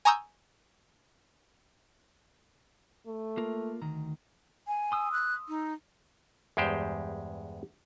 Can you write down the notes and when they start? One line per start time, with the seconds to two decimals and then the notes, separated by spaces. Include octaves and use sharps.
0.05 G#5 A#5 C#6 D#6 E6 G6
3.06 A3
3.37 A#3 F4 A#4
3.82 D2 D#3 A#5
4.67 G#5
4.92 C6 D#6 E6
5.12 F#6
5.48 D#4
6.57 E2 G2 G#3 G4 C5